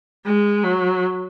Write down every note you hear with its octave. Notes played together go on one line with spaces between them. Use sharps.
G#3
F#3